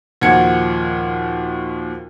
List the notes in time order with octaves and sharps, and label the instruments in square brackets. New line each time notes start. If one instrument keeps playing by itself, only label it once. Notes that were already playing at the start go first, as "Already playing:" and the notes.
[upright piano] D#2 A#2 F3 F#4 G#6 C#7